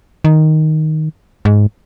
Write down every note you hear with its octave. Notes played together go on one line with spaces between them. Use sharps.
D#3
G#2